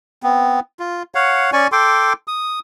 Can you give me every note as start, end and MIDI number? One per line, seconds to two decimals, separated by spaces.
0.23 0.60 59
0.23 0.60 60
0.80 1.03 65
1.15 1.51 73
1.15 1.51 77
1.15 1.51 78
1.53 1.67 61
1.53 1.67 74
1.53 1.67 80
1.53 1.67 85
1.72 2.13 69
1.72 2.13 79
1.72 2.13 84
1.72 2.13 86
2.28 2.59 87